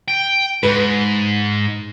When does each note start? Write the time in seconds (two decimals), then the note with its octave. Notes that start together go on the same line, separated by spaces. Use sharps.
0.08 G5
0.63 G#2 B4